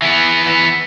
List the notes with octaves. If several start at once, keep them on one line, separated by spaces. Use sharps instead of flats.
E3 B3